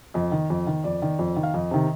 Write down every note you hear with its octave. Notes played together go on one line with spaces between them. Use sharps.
F2 D#5
D#3
F2
D#3
F2 D5
D#3
F2
D#3
F5
F2 D#5
C3 D#3